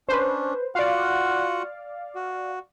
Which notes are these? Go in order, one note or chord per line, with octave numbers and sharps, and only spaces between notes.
C#4 D4 B4 C5
F4 F#4 D5 F5 F#5
F#4